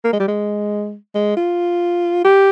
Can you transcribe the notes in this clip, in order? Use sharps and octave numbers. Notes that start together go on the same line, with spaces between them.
A#3
G#3
G3
G#3
G#3
F4
G4